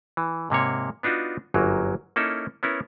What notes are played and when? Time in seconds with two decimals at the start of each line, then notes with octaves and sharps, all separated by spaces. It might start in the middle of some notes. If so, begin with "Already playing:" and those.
0.17 E3
0.50 G#2 C3 A#3 C#5
1.03 B3 D4 D#4 F4 F#4
1.54 G1 F#2 F#3 A#3
2.16 A#3 C#4 D#4 E4 A4
2.63 B3 C#4 E4 A#4